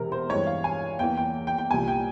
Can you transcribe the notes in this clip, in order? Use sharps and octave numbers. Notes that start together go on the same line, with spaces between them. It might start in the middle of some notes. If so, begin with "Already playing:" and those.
Already playing: E1 E2 C3 A#4
C5
G2 E3 G#3 C4 C#5
F5
G#5
E2 E3 A#3 G5
G5
G5
G5
C2 A#2 G3 A#3 G#5
G5